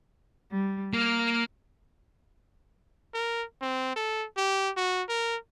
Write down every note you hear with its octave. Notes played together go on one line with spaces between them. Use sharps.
G3
A#3 F6
A#4
C4
A4
G4
F#4
A#4